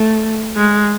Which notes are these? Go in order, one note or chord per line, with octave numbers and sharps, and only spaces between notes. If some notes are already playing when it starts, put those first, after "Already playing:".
Already playing: A3
G#3